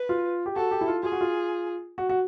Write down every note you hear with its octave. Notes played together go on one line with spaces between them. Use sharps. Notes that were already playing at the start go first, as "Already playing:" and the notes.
Already playing: B4
F4
G4
F#4 A4
G4
E4
F4
F4 G#4
F#4
F4
F#4
F#4